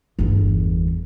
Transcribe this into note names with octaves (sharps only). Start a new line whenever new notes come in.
G1 E2